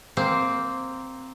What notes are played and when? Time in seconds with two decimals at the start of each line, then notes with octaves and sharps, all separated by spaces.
0.17 A#3 C4